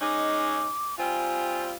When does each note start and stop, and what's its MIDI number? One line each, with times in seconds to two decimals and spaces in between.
0.01 0.70 56
0.01 0.70 61
0.01 0.70 63
0.01 0.98 86
0.98 1.76 55
0.98 1.76 60
0.98 1.76 65
0.98 1.62 80